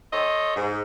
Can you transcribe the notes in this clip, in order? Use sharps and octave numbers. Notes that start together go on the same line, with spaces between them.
A4 C5 C#5 D#5
G#2